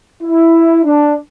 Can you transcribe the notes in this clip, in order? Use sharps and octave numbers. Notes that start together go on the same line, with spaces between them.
E4
D4